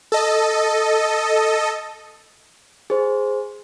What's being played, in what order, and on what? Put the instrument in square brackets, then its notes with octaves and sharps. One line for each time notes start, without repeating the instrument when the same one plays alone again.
[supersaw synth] A4 D#5
[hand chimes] G#4 C5